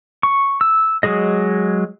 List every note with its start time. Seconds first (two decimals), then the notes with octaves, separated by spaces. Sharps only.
0.23 C#6
0.61 E6
1.03 F#3 G#3 G#4 D#5